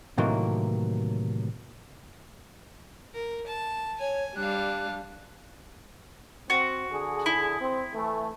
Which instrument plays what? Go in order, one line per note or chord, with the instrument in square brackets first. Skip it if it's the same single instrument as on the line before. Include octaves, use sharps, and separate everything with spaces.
[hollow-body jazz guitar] A2 C3 D#3 E3 F#3 A#3
[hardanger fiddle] A#4
A5
[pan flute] C#5 [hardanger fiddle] G#5
[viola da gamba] G3 [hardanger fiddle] D4 F5 [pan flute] F#6
[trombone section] C4 [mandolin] F#4
[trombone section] D3 G#4
[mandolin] E4
[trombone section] C4
E3 A3